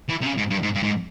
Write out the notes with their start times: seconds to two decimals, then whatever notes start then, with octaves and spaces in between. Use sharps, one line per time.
0.09 E3
0.21 C3
0.26 C#3
0.37 G#2
0.50 G2
0.63 G#2
0.75 G2
0.83 G#2